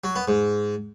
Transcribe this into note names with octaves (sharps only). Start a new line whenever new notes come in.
F#3
B3
G#2